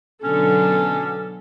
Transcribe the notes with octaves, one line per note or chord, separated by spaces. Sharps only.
B2 D3 F#3 C#4 A4